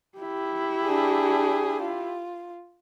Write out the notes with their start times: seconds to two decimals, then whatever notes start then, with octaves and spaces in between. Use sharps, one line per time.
0.18 E4 G4
0.85 D4 G#4
1.82 F4